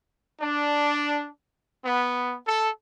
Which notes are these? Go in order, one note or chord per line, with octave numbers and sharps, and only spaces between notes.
D4
B3
A4